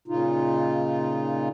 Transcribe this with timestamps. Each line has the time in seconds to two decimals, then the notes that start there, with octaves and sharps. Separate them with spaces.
0.08 A#2 C#3 D#4 F4